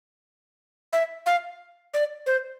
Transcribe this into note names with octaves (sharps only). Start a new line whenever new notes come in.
E5
F5
D5
C5